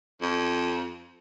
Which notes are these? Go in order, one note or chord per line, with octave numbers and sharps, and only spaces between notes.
F2